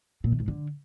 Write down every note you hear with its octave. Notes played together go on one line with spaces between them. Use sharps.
A#2
D#3
G#2
D3